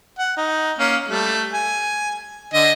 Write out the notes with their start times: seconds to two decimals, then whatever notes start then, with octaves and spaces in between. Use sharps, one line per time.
0.19 F#5
0.37 D#4
0.79 A#3 C#4
1.08 G3 A3
1.53 G#5
2.54 D3 D#5